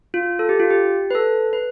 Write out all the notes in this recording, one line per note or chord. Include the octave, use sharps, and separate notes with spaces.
F4
A4
G4
F4
G4
B4
A4
B4